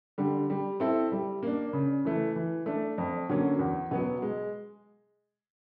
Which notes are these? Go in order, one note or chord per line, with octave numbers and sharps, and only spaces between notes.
D3 G3
G3
C4 E4 A4
G3
A#3 D4
C#3
E3 A3
E3
A3 D4
F2
D3 F#3 A#3 C#4
E2
B2 F#3 B3
G#3